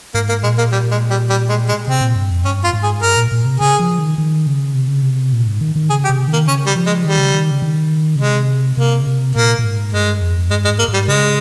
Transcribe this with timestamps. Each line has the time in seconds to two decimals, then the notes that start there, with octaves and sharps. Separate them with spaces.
0.14 G#2 A#3
0.29 A#3
0.43 A#2 G#3
0.58 A#3
0.72 G3
0.91 G#3
1.10 G3
1.30 G3
1.49 G#3
1.68 G#3
1.87 C3 C4
2.01 A#2
2.16 G2
2.31 F2
2.45 G2 C#4
2.64 F4
2.73 G#2
2.83 G#4
3.02 G2 A#4
3.17 A#2
3.32 A#2
3.45 C3
3.60 C#3 G#4
3.79 F3
3.99 D#3
4.18 D#3
4.47 C#3
4.74 C3
4.88 C#3
5.02 C3
5.33 A#2
5.46 G#2
5.61 D#3
5.76 D#3
5.90 C#3 G#4
6.05 G4
6.09 C3
6.28 D#3
6.33 A#3
6.48 C#3 C#4
6.66 G3
6.76 F3
6.86 G#3
7.05 D#3 G3
7.19 C#3
7.33 D#3
7.51 C#3
7.62 D#3
8.16 C#3
8.20 C3 G#3
8.77 C3 A#3
9.01 C#3
9.07 C3
9.35 A#2 A#3
9.59 A#2
9.65 G#2
9.93 G2 G#3
10.21 F2
10.50 G2 G#3
10.65 G#3
10.69 G#2
10.79 A#3
10.88 G#2
10.94 G3
11.08 C#3 G#3